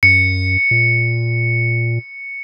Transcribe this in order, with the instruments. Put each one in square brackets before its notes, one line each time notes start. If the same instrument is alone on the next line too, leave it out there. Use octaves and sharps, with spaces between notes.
[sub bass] F#2 [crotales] C#7
[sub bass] A#2